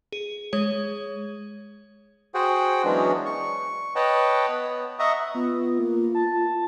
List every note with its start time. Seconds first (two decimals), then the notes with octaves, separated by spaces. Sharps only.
0.12 G#4
0.53 G#3 G#4 C#5
2.34 F#4 G#4 C5 F#5 G5
2.84 E3 F#3 G#3 B3 C#4 D4
3.26 C#6
3.96 B4 C#5 D#5 F#5 G5 A5
4.49 B3
4.99 D#5 E5 F#5 A#5 C#6 D#6
5.35 B3 F4
5.78 A#3
6.15 A5